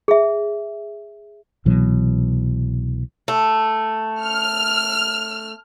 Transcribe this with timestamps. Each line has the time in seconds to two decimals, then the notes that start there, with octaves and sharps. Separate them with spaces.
0.08 G#4 E5
1.65 C2 B2 E3 F#3
3.28 A3
4.24 F6